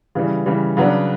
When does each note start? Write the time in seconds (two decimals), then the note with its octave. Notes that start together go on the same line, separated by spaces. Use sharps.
0.15 C#3 E3 G3
0.46 C#3 E3 G3
0.77 C#3 F#3 B3 D4